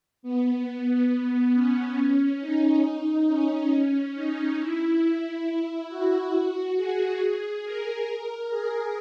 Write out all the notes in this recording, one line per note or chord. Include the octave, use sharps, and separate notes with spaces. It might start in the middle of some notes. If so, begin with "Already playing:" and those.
B3
B3
B3
C#4
D#4
C#4
D#4
E4
E4
F#4
G#4
A#4
A#4
G#4